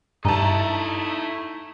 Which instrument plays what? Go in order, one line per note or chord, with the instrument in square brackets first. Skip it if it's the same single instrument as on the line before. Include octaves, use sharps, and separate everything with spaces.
[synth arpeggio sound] G2 [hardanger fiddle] A3 [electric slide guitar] D#4 E4 [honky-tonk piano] A5 A#5